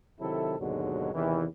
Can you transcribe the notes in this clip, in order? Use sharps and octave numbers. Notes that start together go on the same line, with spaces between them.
C3 D#3 F#3 E4 A4
D#2 G#2 B2 D3 F#3 G#3
E2 C3 D#3 E3